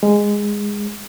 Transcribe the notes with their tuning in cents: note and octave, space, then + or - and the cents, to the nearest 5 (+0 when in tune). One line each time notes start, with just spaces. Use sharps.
G#3 -10